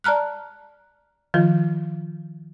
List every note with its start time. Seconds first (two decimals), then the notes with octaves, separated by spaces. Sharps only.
0.04 D5 A5 A#5 F6 F#6
1.34 D#3 F3 F4